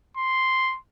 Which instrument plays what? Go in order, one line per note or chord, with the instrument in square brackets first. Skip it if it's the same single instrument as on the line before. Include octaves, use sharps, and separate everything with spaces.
[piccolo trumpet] C6